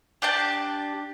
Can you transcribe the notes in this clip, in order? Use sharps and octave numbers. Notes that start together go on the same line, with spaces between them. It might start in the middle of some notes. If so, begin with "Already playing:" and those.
D4 G4 A5